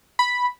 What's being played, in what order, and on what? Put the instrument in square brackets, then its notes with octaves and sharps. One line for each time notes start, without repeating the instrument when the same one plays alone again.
[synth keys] B5